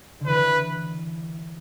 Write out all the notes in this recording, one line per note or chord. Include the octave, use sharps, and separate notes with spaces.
D3
E3 B4